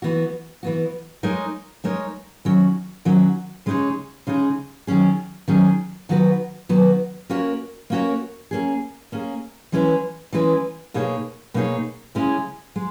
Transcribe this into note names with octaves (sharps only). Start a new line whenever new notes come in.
E3 B3 F#4
E3 B3 F#4
G#3 D#4 A#4 C#5
G#3 D#4 A#4 C#5
D#3 F#3 C#4 F#4
D#3 F#3 C#4 F#4
C#3 G#3 D#4 G#4 C#5
C#3 G#3 D#4 G#4 C#5
D#3 F#3 C#4 G#4
D#3 F#3 C#4 G#4
D#3 F#3 B3 F#4 B4
D#3 F#3 B3 F#4 B4
A#3 C#4 F#4 A#4 C#5
A#3 C#4 F#4 A#4 C#5
A#3 C#4 G#4
A#3 C#4 G#4
E3 G#3 C#4 E4 B4
E3 G#3 C#4 E4 B4
B2 A#3 D#4 G#4 C#5
B2 A#3 D#4 G#4 C#5
C#3 G#3 C#4 E4
G#3